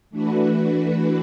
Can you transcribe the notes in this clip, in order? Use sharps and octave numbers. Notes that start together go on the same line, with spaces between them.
E3 A3 D4 F#4 B4